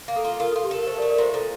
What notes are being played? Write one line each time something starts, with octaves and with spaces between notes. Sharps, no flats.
A#3
A4
F4
F4 A#4
A4
F4
G4
A4 A#4
A3 C5
A#4 D5
A3
A#4 D5
A#2 C5
A#2 A4